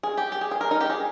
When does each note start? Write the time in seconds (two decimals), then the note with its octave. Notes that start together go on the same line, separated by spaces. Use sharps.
0.03 G#4
0.17 G4
0.32 G4
0.41 G#4
0.51 G#4
0.61 A#4
0.71 D#4
0.81 G4
0.90 G#4